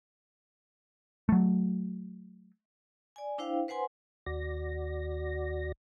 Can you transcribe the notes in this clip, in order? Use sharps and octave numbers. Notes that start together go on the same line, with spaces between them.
F#3 A3
D5 G#5
D4 E4 C5 F5 G5
B4 C5 F#5 G#5 C6
D#2 F#4 D5 A#6